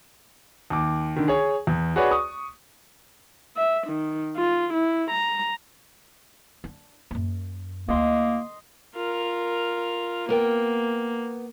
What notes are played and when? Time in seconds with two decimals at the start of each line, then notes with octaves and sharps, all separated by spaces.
0.70 D#2 D6
1.16 D3 D#3
1.28 G#4 C#5
1.67 E2
1.96 F#4 G#4 B4 C#5 D5
2.11 C#6 D#6
3.57 E5
3.87 D#3
4.37 F4
4.73 E4
5.11 A#5
6.64 D4
7.11 F#2 A#3
7.89 D2 A#3 E4 D#5 C6
8.95 F4 A#4
10.29 A#3 B3 A#4 G5